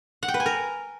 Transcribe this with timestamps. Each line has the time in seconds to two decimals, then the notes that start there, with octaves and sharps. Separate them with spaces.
0.23 F#5
0.28 G5
0.34 B4
0.40 G#5
0.46 A#4